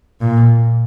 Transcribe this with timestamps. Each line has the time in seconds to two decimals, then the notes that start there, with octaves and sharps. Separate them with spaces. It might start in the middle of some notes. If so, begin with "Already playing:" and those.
0.21 A#2